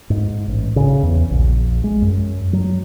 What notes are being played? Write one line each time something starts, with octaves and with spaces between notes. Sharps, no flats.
G#2
A1
C#3
E2
A#1
G#3
F#2
F#3